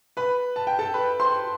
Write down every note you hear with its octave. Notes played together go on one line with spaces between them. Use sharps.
B4 B5
A5
G5
A4 A5
B4 B5
C5 C6